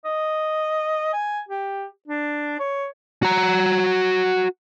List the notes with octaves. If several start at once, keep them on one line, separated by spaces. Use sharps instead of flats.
D#5
G#5
G4
D4
C#5
F#4 A#5